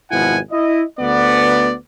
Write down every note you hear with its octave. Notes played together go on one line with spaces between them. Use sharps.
G#1 B2 F3 E4 F#5 G#5
E4 D#5
D2 B3 D5